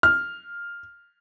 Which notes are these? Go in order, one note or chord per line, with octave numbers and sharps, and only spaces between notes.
F6